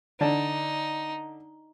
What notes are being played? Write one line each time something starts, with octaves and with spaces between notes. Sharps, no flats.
D3 D#4 D5 A5